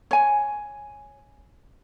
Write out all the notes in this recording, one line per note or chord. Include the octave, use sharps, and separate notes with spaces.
C#5 G#5